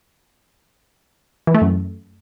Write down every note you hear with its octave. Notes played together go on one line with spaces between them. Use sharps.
E3
A3
F#2